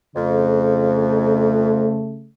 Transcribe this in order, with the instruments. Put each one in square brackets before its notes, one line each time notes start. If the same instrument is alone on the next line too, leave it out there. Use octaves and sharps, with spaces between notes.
[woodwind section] F2 [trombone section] C#3 A3